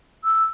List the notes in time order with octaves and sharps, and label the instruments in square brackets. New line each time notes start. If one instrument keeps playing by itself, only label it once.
[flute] E6